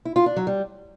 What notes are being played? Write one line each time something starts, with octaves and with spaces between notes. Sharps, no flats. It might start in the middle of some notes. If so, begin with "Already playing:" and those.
E4
F4
D4
F#3
G3